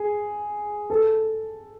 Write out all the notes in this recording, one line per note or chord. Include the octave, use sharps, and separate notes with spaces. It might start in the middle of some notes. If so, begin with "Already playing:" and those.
Already playing: G#4
A4